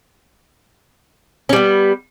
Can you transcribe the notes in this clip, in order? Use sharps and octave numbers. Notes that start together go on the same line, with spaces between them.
G3 B3 C#4